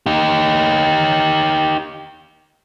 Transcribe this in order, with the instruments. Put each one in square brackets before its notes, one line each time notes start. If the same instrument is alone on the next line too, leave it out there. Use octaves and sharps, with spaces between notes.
[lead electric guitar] D#4 G4